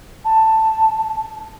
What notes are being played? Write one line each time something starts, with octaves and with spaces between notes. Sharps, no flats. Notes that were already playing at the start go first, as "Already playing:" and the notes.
A5